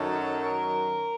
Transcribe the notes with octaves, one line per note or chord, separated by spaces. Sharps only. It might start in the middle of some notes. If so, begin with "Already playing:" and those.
Already playing: F#2 D#3 F#3 A4
A#4